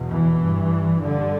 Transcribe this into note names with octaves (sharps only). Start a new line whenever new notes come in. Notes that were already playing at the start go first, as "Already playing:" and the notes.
Already playing: E2 B2
E3
G2
G2 D3